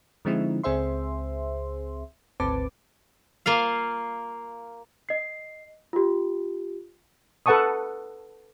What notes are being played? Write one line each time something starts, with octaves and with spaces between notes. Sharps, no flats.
D3 F3 G#3 C4 D#4 E4
C#2 C4 G#4 C5 E5 C6
G#1 D2 C4 B4 A5 D6
A#3 F4 F5
D#5 C7
F4 G4
A4 B4 F#5 A5 C#6 D#6